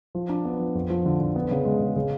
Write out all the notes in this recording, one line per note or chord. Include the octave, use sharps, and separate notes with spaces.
F3
D4
B3
F3
F2
F3
D3
D3
B3
C#3
G#3
C#3
C#3